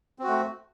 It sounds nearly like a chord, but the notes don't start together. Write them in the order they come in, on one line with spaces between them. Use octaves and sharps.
C4 F#4 A3